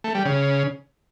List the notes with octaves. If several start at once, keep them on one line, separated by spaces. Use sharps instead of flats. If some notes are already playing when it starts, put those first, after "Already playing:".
A3
G3
C#3